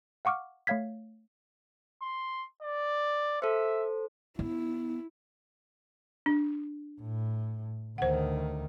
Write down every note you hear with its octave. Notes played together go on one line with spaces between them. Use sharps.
F5 F#5 C#6 D6 F6
A3 C#5 F5 G#6 B6
C6
D5
A4 C5 E5
B3 E4
D4
A2
D2 D#3 C5 F#5